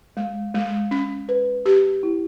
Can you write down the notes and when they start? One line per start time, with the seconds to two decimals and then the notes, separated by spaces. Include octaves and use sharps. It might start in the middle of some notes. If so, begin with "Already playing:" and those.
0.17 G#3
0.55 G#3
0.91 C#4
1.29 B4
1.66 G4
2.03 E4